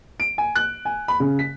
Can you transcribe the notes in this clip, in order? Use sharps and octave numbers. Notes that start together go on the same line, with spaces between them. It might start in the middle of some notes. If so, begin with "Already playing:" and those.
D7
G#5
F#6
G#5
B5
C#3
B6